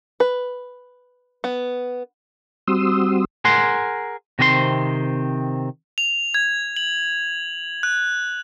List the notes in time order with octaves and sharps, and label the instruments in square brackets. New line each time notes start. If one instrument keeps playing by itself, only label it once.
[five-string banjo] B4
B3
[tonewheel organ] G3 C4 F#4 C6 D#6 E6
[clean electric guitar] G#4 A#4 F#5 C6
C3 D#3 C4 A#4 C6
[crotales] F7
G#6
F#7
F#6